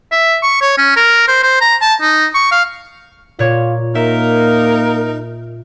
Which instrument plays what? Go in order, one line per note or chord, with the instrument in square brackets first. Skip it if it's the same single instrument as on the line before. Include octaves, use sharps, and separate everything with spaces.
[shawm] E5
C#6
C#5
C#4
A#4
C5
C5
A#5
A5
D#4
C#6
F5
[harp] A#2 C#5 [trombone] F4
[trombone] A#3 [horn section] D#4 A#4 [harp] E5